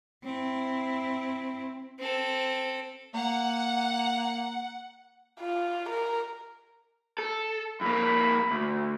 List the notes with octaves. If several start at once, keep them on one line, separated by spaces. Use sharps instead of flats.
C4 E4
C4 A4
A#3 F#5
F4
A#4
A4
F2 A#3 B5
D2